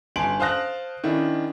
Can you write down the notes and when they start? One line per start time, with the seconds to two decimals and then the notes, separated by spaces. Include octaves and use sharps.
0.16 G1 G#5 A5 C6 D7 F#7
0.40 C5 F5 A5 D#6 F#6 A#6
1.04 D#3 C#4 D4 E4